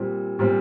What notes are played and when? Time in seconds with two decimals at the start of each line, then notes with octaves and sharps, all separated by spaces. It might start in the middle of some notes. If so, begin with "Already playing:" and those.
Already playing: A#2 G3 C4
0.39 A#2 G3 C4